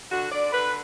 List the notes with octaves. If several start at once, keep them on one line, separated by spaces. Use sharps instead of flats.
D3 F#4
D3 D5
D3 B4